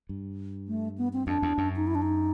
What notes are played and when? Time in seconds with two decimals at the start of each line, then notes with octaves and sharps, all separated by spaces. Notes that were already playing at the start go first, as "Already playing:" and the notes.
0.09 G2
0.68 A3
0.98 B3
1.13 C4
1.27 F2 D4
1.42 E2
1.58 F#2
1.76 D#4
1.87 E4
1.95 D4
2.02 D#4